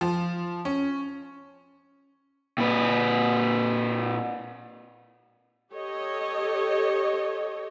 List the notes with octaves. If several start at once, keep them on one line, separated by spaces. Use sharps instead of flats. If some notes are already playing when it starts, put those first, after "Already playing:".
F3
C#4
A#2 B4
G4 A4 C#5 D#5